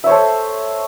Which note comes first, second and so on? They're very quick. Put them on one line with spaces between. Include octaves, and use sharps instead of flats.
E5 C#5 C5 A4